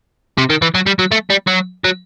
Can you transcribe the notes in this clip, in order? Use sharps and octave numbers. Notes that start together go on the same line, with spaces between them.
C3
D#3
E3
F#3
G3
F#3
A3
G3
F#3
F#3